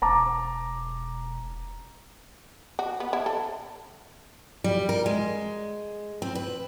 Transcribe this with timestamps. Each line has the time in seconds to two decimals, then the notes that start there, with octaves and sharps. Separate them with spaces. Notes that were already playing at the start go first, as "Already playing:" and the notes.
0.02 E1 A5 A#5 D6
2.79 F#4
3.00 B3
3.13 E4
3.26 A4
4.64 G3
4.89 A#4
5.06 G#3
6.22 C4
6.35 B4